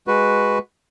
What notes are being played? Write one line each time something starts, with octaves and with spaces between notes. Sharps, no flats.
G#3 F#4 B4